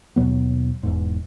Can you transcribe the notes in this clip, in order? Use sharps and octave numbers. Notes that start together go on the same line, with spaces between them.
D#2 B2 F#3 B3
E1 E2 G#2